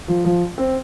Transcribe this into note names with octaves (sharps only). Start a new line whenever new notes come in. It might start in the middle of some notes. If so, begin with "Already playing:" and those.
F3
F3
C4